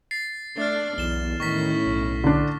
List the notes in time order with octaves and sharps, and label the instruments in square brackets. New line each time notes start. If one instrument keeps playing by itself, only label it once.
[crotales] A6 C7
[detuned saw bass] A3 [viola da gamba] D4 D5 [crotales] F6 A6
[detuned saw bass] B1 [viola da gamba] E2 [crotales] E7 G7
[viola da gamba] A2 C#4 E4 [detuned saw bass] D#3 [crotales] C#6 A#6 B6
[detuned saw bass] B1
[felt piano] D3 D4